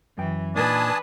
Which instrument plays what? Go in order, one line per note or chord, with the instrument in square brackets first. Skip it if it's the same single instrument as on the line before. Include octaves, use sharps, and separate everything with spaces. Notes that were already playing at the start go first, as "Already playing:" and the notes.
[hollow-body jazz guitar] F#2 G5 [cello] E3
[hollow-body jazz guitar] A#2 D#4 [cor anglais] D4 [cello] B4 [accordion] G#5 A5 D#6